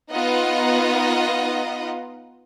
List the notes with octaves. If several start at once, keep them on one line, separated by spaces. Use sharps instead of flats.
B3 D#4 F4 D#5 F#5